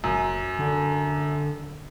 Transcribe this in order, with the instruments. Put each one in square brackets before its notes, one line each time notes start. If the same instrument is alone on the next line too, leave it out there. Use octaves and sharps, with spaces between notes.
[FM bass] F#1 [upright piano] F#2
[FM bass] D3